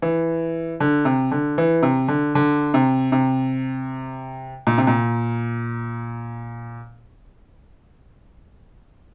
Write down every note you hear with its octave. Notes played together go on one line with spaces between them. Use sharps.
E3
D3
C3
D3
E3
C3
D3
D3
C3
C3
A#2
C3
A#2